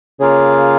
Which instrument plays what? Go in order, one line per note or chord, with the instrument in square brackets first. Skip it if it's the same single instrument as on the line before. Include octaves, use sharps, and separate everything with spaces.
[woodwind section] C#3 [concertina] A#3 F4 G#4